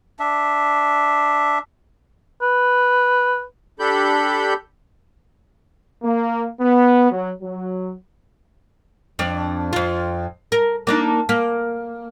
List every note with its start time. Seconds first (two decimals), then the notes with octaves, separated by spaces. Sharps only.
0.19 D4 E5
2.42 B4
3.79 D4 G4 A4 B5 G6
6.03 A#3
6.61 B3
7.11 F#3
7.42 F#3
9.19 F2 D4
9.73 F2 F4
10.52 A#4
10.87 A#3 D4 D#4
11.29 A#3